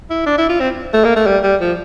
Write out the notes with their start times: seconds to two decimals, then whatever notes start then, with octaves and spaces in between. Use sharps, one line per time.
0.10 E4
0.26 D4
0.38 E4
0.49 F4
0.60 C4
0.94 A3
1.04 A#3
1.16 A3
1.27 G3
1.44 G3
1.61 F3